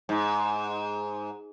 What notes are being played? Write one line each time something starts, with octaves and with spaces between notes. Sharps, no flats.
G#2